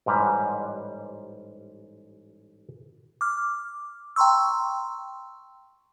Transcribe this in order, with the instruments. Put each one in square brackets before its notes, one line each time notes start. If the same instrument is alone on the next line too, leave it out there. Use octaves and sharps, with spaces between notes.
[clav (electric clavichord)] A1 G#2 G3 B4 A#5
[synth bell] D6 F6
G5 A#5 C6 C#6 E6